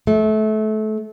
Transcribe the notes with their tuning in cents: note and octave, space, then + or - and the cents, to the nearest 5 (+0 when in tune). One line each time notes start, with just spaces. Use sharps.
A3 -25